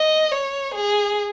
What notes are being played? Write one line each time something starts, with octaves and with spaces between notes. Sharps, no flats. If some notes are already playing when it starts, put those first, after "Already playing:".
Already playing: D#5
C#5
G#4